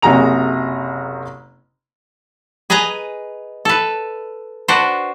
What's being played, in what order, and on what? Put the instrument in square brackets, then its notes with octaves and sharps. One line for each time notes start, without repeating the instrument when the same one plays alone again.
[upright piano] F#1 C3 F#4 G#4 A#5 F7
[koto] G#4 B4 D#5 G#5 A#5
A4 B4
D4 F#4 B4 C5